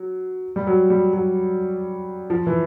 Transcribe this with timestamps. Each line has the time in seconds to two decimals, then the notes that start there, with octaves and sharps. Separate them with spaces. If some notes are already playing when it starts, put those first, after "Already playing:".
Already playing: F#3
0.56 G3
0.67 F#3
0.90 G3
1.13 F#3
2.30 F3
2.47 E3